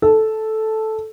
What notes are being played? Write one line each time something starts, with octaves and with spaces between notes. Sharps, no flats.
A4